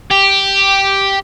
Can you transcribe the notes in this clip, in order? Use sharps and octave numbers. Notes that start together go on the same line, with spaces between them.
G4